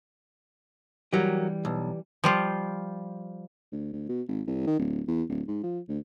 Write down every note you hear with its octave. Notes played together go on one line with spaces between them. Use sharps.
E3 F#3 G3 A#3 G4
B1
F3 G3 F4
D2
D2
B2
G#1
C2
D#3
D1
E2
D1
G#2
F3
D2